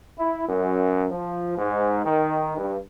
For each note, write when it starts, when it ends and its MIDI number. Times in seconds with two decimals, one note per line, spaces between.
0.16 0.44 64
0.49 1.05 42
1.11 1.54 53
1.57 2.03 44
2.05 2.56 51
2.57 2.77 43